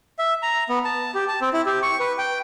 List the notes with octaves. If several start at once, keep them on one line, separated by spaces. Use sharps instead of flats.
E5
A#5
B3
A5
G4
A5
C4
E4
G4
C#6
B4
G5